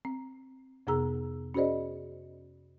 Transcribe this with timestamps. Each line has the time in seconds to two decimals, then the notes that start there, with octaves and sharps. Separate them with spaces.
0.05 C4
0.87 F2 C3 B3 G#4 A#5 E6
1.54 C#4 F#4 G#4 C5 D5 D#5